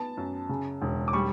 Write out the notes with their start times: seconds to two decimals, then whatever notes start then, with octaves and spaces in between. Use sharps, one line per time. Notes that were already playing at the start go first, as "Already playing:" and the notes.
Already playing: B3 A5
0.17 F#2
0.49 C#3
0.82 E1
1.08 D6
1.13 G3 C#6